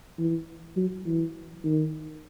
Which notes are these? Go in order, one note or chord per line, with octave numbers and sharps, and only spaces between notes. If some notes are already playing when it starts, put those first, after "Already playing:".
E3
F#3
E3
D#3